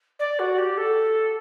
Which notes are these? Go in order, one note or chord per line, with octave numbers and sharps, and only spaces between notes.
D5
F#4
G4
A4